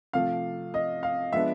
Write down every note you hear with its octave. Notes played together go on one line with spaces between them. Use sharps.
C3 F3 A3 F5
D#5
F5
F3 G#3 B3 D4 E5